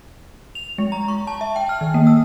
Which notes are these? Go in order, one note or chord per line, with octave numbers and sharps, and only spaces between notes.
F7
G#3
A#5
C#6
A5
E5
G5
F6
D#3
A#3
E6